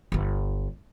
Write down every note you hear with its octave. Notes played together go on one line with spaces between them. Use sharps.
G1 F4